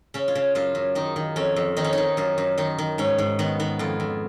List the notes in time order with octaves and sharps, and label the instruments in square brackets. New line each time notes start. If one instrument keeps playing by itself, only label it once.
[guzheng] C#3 C#4
F4
C#3
F#2 F4
F#2
D#3 D#4
D#3
F2 C#4
F2
D#3 D#4
C#4
D#3 D#4
F#2 F4
F#2
D#3 D#4
D#3
G#2 C#4
G#2
D#3 B3
D#3 B3
F2 F4
F2